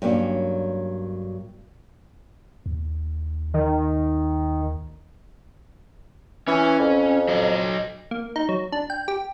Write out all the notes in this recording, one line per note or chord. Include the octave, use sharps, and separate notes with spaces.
G2 F#3 A#3 C#4
D#2
D#3
E3 C#4
F2
F#3 D#5
A#3
D#4
F#3
D4
G5
G4